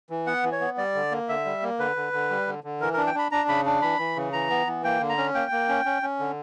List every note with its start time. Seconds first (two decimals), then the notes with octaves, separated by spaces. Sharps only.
0.10 E3
0.27 B3 F#5
0.44 E3
0.52 C#5
0.61 B3
0.77 G3 D5
0.95 D3
1.11 A#3
1.29 D3 E5
1.45 G3
1.62 A#3
1.79 D3 B4
1.96 D3
2.13 D3
2.30 G3
2.47 D3
2.64 D3
2.81 E3 A#4
2.93 D4 A#4
3.07 G5
3.14 D4 B5
3.31 D4 A#5
3.48 C#3 B5
3.65 D4
3.82 E3 B5
3.99 E3
4.16 C#3
4.33 E3 A#5
4.50 B3
4.67 E3
4.84 A#3 G5
5.01 D3
5.09 A#5
5.18 C#4
5.35 A#3 G5
5.52 A#3
5.69 C#4
5.86 C#4
6.02 C#4
6.19 D3